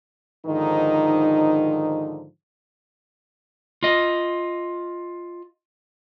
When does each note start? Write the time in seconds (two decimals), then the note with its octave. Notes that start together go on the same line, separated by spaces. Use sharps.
0.46 G#2 D3 D#3 F3 D#4
3.83 F4 D#5